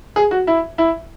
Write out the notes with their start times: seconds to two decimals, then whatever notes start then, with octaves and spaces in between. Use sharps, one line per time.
0.16 G#4
0.31 F#4
0.47 E4
0.78 E4